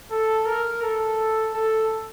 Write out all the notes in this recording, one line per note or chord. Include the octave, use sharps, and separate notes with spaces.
A4
A#4
A4
A4